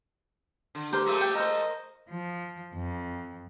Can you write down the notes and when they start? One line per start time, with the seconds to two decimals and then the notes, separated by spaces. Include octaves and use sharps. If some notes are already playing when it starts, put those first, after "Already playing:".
0.75 D3
0.93 G4 A#4 C5
1.06 F3 G#3 A3
1.21 G5
1.35 A#4 C5 D#5
2.08 F3
2.73 F2